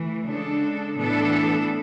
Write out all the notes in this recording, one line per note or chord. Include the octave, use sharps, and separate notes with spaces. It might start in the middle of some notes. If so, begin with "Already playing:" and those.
Already playing: E3 A3
C#3 G#3 D4 A4
A2 E3 B3 D4 A4